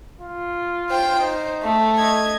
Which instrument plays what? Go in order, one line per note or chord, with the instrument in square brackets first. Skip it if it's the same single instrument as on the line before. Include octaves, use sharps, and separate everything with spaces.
[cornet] F4
[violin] C5 G5
[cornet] D#4 [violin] C5
[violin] A3
[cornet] D#5 [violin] G#6